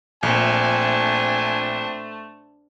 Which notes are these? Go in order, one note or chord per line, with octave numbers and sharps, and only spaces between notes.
A#1 A3 C4 D4 G#5